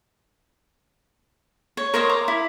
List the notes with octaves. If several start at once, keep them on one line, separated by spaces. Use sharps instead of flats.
C#5
A#4 C5 C#5 D#5
A#5 C6 D6
E4